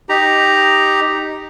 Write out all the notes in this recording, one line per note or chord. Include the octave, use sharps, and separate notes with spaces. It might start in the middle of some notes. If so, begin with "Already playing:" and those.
D#4 G4 A#5